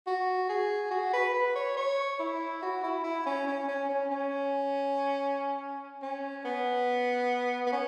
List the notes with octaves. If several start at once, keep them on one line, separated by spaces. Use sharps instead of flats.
F#4
G#4
F#4
B4
B4
C#5
C#5
E4
F#4
E4
E4
C#4
C#4
C#4
C#4
C#4
C#4
B3
B3
C#4